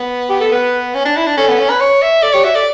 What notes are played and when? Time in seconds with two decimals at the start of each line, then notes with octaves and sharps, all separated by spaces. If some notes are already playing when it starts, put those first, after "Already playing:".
Already playing: B3
0.29 G4
0.40 A4
0.52 B3 B4
0.94 C#4
1.05 D4
1.17 E4
1.27 D4
1.37 C#4 A4
1.48 B3
1.59 C#4
1.70 B4
1.80 C#5
2.02 E5
2.22 A4 D5
2.34 G4 C#5
2.44 F#4 E5
2.55 A4 D5